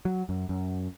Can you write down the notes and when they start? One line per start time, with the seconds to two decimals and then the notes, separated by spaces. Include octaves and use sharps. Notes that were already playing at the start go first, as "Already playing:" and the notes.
0.05 F#3
0.29 F#2
0.49 F#2